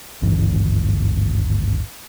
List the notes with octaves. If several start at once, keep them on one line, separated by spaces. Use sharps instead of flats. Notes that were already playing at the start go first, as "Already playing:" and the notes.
G#1 D2 G2 E3